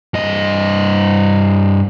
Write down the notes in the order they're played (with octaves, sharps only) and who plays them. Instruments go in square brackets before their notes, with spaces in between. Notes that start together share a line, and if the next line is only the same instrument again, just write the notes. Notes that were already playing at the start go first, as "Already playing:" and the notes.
[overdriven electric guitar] G2 D#5